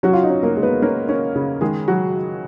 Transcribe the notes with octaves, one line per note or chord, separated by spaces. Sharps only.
F#3 C#4 F#4
F4
D#4
C#4
A#3 A#4
G#3
B3 B4
A#3 C#4 A#4
C#4
C#3
D#3 G#3 G#4
F#3 F#4